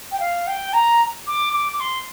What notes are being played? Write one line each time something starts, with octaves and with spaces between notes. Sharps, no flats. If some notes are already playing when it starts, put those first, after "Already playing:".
G5
F5
G5
A#5
D6
D6
D6
C6